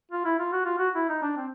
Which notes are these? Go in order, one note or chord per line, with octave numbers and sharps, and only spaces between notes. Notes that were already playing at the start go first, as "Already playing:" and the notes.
F4
E4
F4
F#4
F4
F#4
E4
D#4
D4
C4